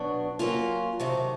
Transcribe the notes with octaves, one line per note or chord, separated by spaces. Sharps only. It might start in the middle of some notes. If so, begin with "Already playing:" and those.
Already playing: B2 F#3 B3 D4
F#3 A#3 C#4 F4
C3 D#3 F#3 A3